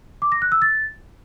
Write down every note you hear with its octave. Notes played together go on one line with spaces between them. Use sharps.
D6
A#6
F#6
E6
A6